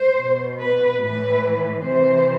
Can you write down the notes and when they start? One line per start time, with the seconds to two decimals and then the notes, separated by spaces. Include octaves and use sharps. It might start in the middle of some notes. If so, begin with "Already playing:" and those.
Already playing: C5
0.17 B2
0.59 B4
1.00 A2 E3 B4
1.83 C3 E3 C5